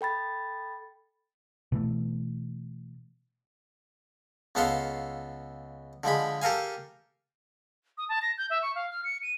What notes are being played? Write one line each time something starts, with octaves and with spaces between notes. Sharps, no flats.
A4 G5 B5 A6
B2 E3 A3
C#2 B3 A4 F5 C6
D3 F3 G#3 B5
G4 A4 A#4 F5 G#5
D#6
A5
A#6
G6
E5
C#6
F5
F6
C#7
D#7